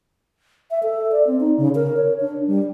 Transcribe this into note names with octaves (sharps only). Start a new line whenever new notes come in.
E5
A4
D5
C4
D#4
C#3
A#4
C#5
D4
G3